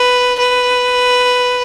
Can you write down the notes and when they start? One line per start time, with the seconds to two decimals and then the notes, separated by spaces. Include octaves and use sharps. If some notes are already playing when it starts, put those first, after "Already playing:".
Already playing: B4
0.39 B4